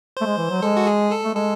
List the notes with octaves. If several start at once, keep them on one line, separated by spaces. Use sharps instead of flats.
A3 C5
G#3
E3
F#3
G#3 A4
F#4
G#4
A4
A3
G#3 A4